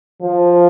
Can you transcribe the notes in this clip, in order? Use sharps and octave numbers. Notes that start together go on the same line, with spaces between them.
F3